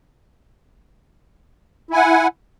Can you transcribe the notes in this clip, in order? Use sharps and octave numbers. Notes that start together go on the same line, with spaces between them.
E4 F#5 G#5